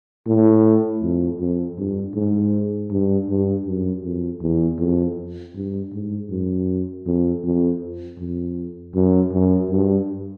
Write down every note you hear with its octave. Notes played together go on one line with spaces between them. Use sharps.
A2
F2
F2
G2
G#2
G2
G2
F#2
F2
E2
F2
G2
G#2
F#2
F2
F2
F2
F#2
F#2
G2